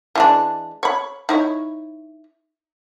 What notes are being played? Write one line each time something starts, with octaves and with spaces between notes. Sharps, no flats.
E3 G#3 D4
C#5 B5
D#4 E4 C#5